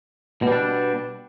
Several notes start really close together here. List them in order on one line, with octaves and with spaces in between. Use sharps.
B2 G3 D4